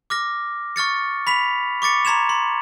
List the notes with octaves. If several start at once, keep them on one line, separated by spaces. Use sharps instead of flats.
D6 F6 A#6
C#6 F6 A6 C#7
B5 B6 F7
C#6 D6 A6 C#7
A#5 C6 G#6 E7 F7
C6